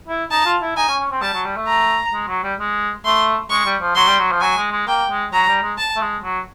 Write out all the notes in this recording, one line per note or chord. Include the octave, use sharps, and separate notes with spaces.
E4
D#4 A5
F4
E4
D#4 G#5
C#4
C#4
C4
G3 A5
F#3
G3
A3
A#5
G#3
F#3
G3
G#3
A3 C6
G#3 C#6
G3
F3
F#3 C6
G3
F#3
F3
F#3 G#5
G#3
G#3
A#3 G5
G#3
F#3 A#5
G3
G#3
A5
A3
G#3
F#3